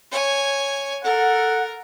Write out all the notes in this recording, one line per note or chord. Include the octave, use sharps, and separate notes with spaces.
C#5 G#5
A4 A#4 F#5